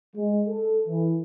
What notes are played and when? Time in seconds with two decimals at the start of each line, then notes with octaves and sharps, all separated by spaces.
0.16 G#3
0.47 A4
0.87 E3